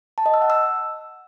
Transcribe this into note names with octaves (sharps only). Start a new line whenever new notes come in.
A5
D#5
E6
F#5
E6